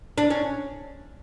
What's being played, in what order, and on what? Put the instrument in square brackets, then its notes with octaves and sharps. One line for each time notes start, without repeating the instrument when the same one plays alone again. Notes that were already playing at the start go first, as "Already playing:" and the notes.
[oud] D4
C#4